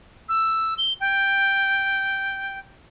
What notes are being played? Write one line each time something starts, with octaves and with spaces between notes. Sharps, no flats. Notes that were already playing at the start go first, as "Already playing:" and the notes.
E6
G7
G5